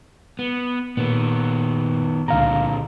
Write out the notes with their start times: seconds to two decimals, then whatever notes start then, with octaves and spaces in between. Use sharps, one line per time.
0.39 B3
0.97 A#2 D#3 B3
2.28 C#2 A#2 D3 F5 A#5